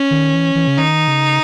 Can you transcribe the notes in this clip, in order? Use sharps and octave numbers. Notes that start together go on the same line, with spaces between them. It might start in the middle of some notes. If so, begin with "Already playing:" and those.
Already playing: C#4
D#3
E3
E3
C#3
D#3 D#4
C#3